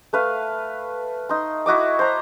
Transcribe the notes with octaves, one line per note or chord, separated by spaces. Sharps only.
A3 B4 F5
D#4 C6
E4 F#4 D#5 D6
C5 A#5